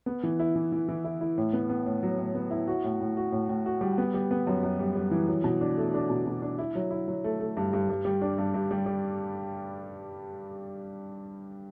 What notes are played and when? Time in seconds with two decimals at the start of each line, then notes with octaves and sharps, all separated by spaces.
0.06 B3
0.23 E3
0.39 E4
0.55 E3
0.72 E3
0.89 E3
1.04 E4
1.21 E4
1.37 A2
1.53 B3
1.69 B3
1.86 A2
2.03 F#3
2.18 A2
2.35 B3
2.51 E4
2.68 F#4
2.84 A2
3.00 A2
3.17 F#4
3.32 A2
3.49 A2
3.66 F#4
3.81 G3
3.98 B3
4.14 G3
4.31 B3
4.47 F#2
4.63 F#2
4.79 G3
4.95 G3
5.11 E3
5.28 F#3
5.44 B2
5.61 D4
5.77 A3
5.94 D4
6.10 B2
6.27 B2
6.42 D4
6.58 E4
6.75 F#3
6.91 E4
7.08 F#3
7.24 A3
7.40 A3
7.57 G2
7.73 G2
7.89 G2
8.05 G3
8.22 D4
8.38 G2
8.54 G2
8.71 G3
8.86 G3